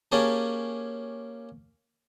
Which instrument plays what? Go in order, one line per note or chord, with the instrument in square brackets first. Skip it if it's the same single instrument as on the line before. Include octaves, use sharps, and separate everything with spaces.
[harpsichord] A#3 C#4 G4 G#4 A5